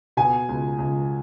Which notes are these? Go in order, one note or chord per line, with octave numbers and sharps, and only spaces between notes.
B2 G#5
C#2
C#2